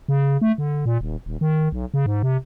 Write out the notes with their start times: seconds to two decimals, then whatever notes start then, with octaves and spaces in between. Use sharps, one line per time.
0.09 C#3
0.42 A3
0.58 D3
0.86 A#2
1.01 D#1
1.26 D#1
1.41 D#3
1.72 B1
1.94 C#3
2.06 G#2
2.23 C3